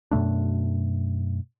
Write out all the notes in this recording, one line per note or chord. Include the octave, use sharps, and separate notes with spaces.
F#2 B2 A3 D4